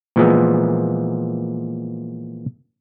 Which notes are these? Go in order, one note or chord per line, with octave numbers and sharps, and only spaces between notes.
A#2 E3 F3 G#3 B3